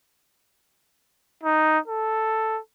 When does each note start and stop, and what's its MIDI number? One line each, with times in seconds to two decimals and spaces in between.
1.43 1.79 63
1.88 2.60 69